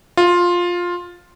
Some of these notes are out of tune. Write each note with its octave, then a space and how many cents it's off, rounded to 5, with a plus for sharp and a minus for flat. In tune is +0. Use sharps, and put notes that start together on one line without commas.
F4 +10